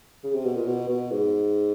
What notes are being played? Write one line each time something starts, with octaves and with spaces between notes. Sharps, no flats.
C#3
C3
B2
A#2
B2
B2
G#2